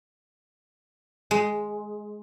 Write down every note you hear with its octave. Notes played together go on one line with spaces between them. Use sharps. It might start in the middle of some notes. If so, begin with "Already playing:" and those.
G#3